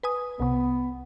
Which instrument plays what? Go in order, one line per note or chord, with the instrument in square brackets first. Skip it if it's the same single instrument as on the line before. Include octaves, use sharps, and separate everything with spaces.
[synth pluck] B4 G#5 D#6
[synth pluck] C2 C3 [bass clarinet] B3